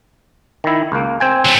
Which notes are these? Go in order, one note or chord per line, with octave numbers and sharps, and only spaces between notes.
D#3 E4
C#2 A#3
C4 G5 G#5
F#3 A3